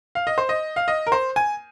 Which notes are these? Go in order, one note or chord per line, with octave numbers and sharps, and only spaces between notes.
F5
D#5
C5
D#5
F5
D#5
A#4
C5
G#5